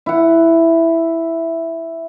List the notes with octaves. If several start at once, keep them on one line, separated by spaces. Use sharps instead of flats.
E4 F#5